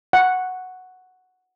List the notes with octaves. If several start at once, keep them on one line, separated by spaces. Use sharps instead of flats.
F#5